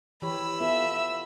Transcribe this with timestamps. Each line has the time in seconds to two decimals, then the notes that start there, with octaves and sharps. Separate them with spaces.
0.22 E3 G4 C#5 B5 E6
0.61 B3 F4 A4 E5